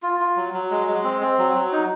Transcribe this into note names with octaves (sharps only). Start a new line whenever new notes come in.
F4
F4
F#3
F#3
G#3
G#3
C4
C4
F#3
F#3
D#4